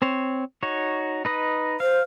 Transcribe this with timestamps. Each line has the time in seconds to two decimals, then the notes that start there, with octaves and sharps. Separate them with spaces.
0.02 C4 C5 C#5
0.63 D#4 F#4 C#5
1.25 D#4 B4 D#5
1.80 C5 F5